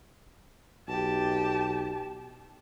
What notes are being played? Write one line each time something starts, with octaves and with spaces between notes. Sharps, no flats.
B1 G4 A5